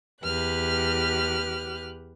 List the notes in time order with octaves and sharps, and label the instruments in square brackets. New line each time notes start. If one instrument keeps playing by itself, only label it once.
[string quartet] E2 G4 B4 F6 F#6